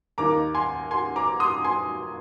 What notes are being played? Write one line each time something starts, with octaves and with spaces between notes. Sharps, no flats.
D#2 D#3 A#3 D#4 A#5 D6
G#5 C6
G#5 C6
A#5 D6
C6 D#6
G#5 C6